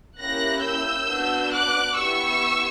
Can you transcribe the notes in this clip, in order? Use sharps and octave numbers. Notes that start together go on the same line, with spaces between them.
A#3 C#4 E4 G4 F#6 A#6
E6 G6
B3 D4 F#4
D6 F#6
B3 E4 G4 C#6 E6